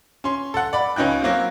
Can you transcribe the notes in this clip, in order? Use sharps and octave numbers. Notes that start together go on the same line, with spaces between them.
C#4 C6
A4 F#5
D5 B5
C#2 C#4 D#4 G5 F#6
F#3 A#3 C4 F#4